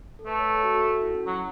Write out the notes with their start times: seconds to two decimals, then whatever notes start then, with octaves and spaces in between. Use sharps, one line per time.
0.19 A4
0.26 A3 B4
0.39 C#5
0.57 A4
0.64 F#4
0.76 A4
0.89 F#4
1.02 E4
1.15 C#4
1.27 F#3 E4